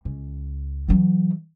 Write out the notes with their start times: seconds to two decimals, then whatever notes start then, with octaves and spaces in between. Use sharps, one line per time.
0.05 C#2
0.88 E3 F#3